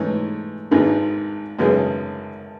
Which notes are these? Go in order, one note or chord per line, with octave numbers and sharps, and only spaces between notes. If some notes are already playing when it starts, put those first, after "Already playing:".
Already playing: G#2 E3 A3 C#4
G#1 G#2 D#3 G#3 B3
G#1 F#2 C#3 G#3 B3